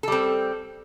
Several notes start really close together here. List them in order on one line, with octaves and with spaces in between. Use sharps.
A4 G3 C4